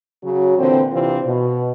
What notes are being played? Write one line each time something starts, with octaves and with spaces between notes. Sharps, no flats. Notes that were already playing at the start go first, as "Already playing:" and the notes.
C#3 F#3 F#4
A#2 D3 E3 C4
C3 E3 C4 D4 F4
B2